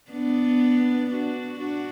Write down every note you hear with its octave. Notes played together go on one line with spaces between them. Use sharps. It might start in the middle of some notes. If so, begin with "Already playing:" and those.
B3 D4
D4 F#4
D4 F#4